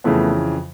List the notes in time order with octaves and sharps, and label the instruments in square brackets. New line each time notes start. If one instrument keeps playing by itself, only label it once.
[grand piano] F2 C#3 E3 A3 B3